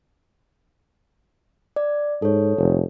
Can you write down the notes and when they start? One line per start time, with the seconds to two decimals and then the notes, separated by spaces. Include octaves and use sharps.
1.76 D5
2.22 G#2 A4 C#5
2.58 F1